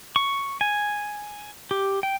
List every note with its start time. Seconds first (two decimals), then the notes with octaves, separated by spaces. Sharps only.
0.16 C#6
0.61 G#5
1.71 G4
2.03 G5